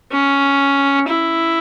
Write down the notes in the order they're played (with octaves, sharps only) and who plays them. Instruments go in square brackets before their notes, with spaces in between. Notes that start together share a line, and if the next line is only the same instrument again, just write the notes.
[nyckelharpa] C#4
E4